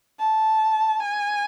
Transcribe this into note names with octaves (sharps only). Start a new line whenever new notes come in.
A5
G#5